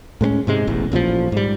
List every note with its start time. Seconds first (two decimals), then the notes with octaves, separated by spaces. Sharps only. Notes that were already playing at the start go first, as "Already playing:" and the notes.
0.21 A2 G#3 B3 C#4
0.47 G#2 C3 G#3
0.67 E1 A1 E2
0.92 A1 A#2 C#3 F3
1.32 G#2 G3